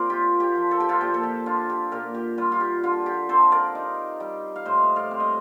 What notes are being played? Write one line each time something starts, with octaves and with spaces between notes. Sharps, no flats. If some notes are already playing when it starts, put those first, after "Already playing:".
Already playing: A#2 C4 A#4 C5 D5
F4 G4
G4
F3
A4
G4
F4 A4
A#2 G4
A4
G4
D4 F4
G4
A#2 G4 A#4
G4
G3 F4
F4
G4
D3 F4
G4
C4 A4 C5
A#4 D5
D#4
G3
F5
A2 C5 D#5
D5 F5
C4
D#5